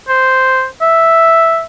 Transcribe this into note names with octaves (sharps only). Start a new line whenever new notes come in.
C5
E5